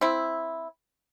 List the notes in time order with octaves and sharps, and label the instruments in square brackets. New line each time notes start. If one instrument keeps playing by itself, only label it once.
[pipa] C4 E4